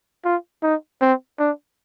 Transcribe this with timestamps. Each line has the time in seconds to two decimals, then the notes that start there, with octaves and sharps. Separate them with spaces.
0.25 F4
0.63 D#4
1.01 C4
1.39 D4